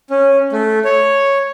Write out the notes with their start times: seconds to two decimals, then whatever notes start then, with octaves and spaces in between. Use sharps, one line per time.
0.10 C#4
0.53 A3
0.85 C#5